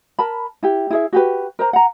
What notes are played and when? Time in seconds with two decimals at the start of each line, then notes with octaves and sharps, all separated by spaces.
0.19 A#4 A5 B5
0.63 E4 G4
0.90 E4 G#4 E5
1.13 F#4 G4 B4
1.59 A#4 C5 A#5
1.73 F#5 A#5